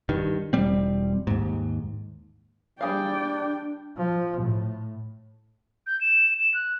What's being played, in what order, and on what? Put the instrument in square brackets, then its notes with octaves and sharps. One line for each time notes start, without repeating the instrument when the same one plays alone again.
[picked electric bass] G2 D#3
E1 G3 C4
D#2 G#2
[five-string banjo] G3 G#4 F5 [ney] D4 [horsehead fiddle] D5 G5
[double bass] F3
A2
[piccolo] G6
E7
E7
F#6